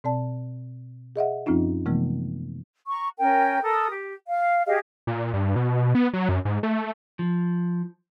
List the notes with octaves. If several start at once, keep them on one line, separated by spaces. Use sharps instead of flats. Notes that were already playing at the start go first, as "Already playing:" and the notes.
B2 C4 D5 A5
G#4 D#5 E5 F#5
F#2 F3 C4 C#4 D#4 F4
C3 E3 F3 G#3 A3 B3
A#5 C#6
C#4 A#4 G5 G#5
A4 A#4 D#6
G4
F5
G4 G#4 D#5 F5
A#2
G2
B2
B3
F#3
F#2
G#2
A3
F3